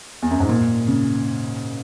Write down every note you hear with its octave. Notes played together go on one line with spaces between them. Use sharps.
E2
F#2
G#2
A#2
C#3